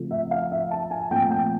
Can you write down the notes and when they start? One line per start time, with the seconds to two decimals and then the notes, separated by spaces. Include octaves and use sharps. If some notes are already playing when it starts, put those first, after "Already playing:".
Already playing: C#3 F3 A3 C4
0.11 E5
0.31 F5
0.51 E5
0.71 A5
0.91 G#5
1.11 A#2 F3 A3 C4 G5
1.31 G5